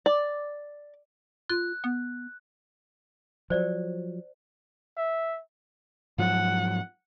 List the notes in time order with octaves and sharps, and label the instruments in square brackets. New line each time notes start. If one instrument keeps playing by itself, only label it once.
[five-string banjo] D5
[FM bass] F4 [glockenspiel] F#6
[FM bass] B3
[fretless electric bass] F3 F#3 [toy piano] C5 D5
[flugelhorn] E5
[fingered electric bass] G#2 F3 F#3 [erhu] F#5